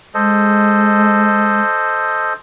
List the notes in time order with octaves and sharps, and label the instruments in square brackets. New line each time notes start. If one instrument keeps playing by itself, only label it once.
[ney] G#3 [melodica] A4 C5 D#5